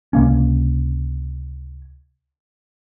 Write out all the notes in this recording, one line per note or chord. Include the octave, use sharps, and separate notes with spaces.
C#2 C3 A#3 C#4